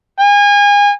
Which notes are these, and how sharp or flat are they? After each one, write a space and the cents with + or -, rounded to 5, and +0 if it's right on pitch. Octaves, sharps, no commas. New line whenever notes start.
G#5 -30